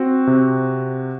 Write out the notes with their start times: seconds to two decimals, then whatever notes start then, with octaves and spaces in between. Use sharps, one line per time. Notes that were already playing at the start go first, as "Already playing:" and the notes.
Already playing: C4 F#4
0.27 C3